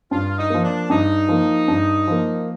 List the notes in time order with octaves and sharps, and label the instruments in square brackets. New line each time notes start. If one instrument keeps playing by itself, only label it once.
[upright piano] G2 [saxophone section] F4
[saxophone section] D#4
[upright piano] F3 A#3
[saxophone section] D4
[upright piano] G2 [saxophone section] D#4
[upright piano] F3 A#3
G2
F3 A#3